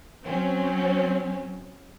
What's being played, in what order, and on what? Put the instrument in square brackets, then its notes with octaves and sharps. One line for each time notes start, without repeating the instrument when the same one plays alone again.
[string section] F#3 C4 C#4